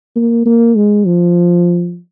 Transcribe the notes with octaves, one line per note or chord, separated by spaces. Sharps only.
A#3
A#3
G#3
F3